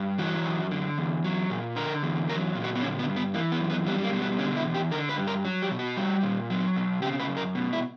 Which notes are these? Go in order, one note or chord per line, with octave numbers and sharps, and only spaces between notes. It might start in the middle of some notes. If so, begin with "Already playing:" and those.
Already playing: G2
E3 F#4
F#2
D3
E2
F#3
A#2
D3 A#4
E2
F#3 A#4
A#2
F#4
B3
D3 C#4
B3
G2
B3
E3 A#3
B3
F#2
B3
G3 B3
A#3
B2
B3
D3 C#4
E4
E2
G4
D3 A#4
B4
G2
A#4
F#3
G4
B2
F#4
G3
A#2
F#3
B2
C#3 G4
B4
F#2
A#4
B2
E4